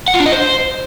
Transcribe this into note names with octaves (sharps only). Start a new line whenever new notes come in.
F#5
F4
D4
D#5
C5